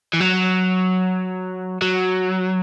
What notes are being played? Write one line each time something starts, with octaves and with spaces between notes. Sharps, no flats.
E3
F#3
F#3